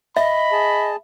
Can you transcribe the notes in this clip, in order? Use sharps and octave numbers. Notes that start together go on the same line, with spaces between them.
D#5 E5 B5
G#4 A5